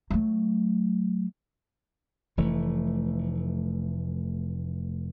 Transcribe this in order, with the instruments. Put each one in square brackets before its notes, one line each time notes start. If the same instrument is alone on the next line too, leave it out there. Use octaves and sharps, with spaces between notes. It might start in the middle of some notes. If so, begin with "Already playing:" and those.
[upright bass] F#3 A3
[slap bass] F1 E3 A3